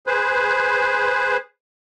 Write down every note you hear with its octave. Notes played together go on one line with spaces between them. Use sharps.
G#4 B4 C5